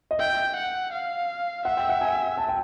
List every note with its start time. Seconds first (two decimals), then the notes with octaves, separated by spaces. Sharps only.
0.11 D#5
0.19 E5 G5
0.56 F#5
0.93 F5
1.65 E5 F#5
1.77 G5
1.89 F#5
2.01 G#5
2.38 A5
2.48 G5